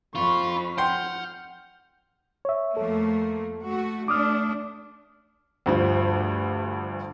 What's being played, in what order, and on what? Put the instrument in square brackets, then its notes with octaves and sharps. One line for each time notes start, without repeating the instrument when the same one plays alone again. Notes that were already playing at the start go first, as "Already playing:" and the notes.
[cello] F2 [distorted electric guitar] F4 [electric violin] B5 C#6
[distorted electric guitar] F#5 [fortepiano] G5 C6 [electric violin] F6 G6
[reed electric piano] C#5 E5
[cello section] F2 A3 A#3 [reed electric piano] A4
[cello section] A3 F#4
[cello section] A3 D4 [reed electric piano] D6 D#6 F6
[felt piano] D2 G2 F3